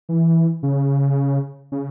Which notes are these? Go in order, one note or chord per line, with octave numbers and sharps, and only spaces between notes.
E3
C#3
C#3